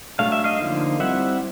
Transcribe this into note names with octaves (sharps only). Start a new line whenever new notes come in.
F#3 A3 D4 F5
E5
D#5 F5
D3 F3 A#3 D#4
G3 C4 E4 E5 F#5